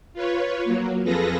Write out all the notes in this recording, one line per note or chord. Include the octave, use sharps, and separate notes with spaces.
F4 B4 C#5
F#3 A#3
F2 F4 G#4 A4 B4 A#6